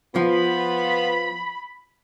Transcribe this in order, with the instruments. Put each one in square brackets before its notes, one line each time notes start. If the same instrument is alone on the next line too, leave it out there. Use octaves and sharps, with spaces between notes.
[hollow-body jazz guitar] F3 [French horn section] B3 F4 [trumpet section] B5